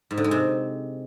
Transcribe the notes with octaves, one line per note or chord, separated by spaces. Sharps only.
G#2
D3
G#3
C3